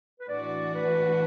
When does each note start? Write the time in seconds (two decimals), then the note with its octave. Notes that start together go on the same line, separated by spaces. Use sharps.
0.20 B4
0.28 A2 E3 D4 F#4 D5
0.75 B4